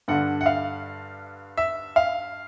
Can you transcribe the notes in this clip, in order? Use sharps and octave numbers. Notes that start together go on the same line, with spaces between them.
G2 D3 F#5
F#5
F5
E5
F5